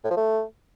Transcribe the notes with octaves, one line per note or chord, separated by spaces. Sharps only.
A2
F3
A3